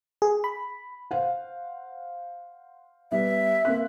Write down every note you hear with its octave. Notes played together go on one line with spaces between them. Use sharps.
G#4
B5
C5 F5 F#5
G3 B3 E5
A#3 C4 F#6